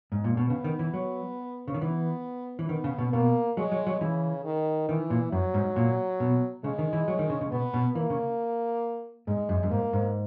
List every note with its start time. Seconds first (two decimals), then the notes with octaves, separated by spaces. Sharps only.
0.12 G#2
0.24 A#2
0.37 B2
0.50 C#3 B3
0.64 D#3
0.79 E3
0.94 F#3
1.68 C#3
1.74 D#3
1.81 E3 B3
2.59 E3
2.69 D#3 B3
2.84 C#3
2.98 B2
3.13 B2 A#3
3.57 F#3 G#3
3.72 F#3
3.87 F#3
4.00 C#3 E3
4.44 D#3
4.88 D#3 E3
5.10 A#2
5.32 F#2 F#3
5.54 G#2
5.76 A#2
6.20 B2
6.64 C#3 G#3
6.79 D#3
6.93 E3
7.08 F#3
7.19 D#3
7.30 C#3
7.41 C#3
7.51 B2 B3
7.74 B2
7.95 E3 A#3
8.10 C#3
9.27 G#2 G#3
9.49 F#2
9.63 F#2
9.71 G#2 A#3
9.93 G#2